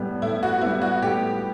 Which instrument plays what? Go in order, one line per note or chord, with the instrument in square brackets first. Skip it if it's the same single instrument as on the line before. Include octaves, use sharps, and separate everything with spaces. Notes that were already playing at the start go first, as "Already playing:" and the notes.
Already playing: [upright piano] A2 G3 B3
[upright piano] A2 [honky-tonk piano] E4
[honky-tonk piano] F#4
[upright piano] G3 B3 [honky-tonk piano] E4
[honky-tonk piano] F#4
[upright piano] A2 [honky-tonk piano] G4